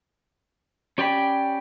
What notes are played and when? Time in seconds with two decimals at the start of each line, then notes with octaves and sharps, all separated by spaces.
0.98 C#4 G4 D5 G5 B5